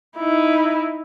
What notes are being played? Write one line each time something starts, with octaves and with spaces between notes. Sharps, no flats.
D#4 E4